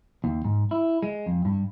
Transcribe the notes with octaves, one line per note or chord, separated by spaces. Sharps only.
D#2
G#2
E4
G#3
F2
G2